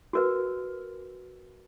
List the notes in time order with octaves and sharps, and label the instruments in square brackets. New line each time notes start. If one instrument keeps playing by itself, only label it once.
[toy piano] F#4 A#4 B4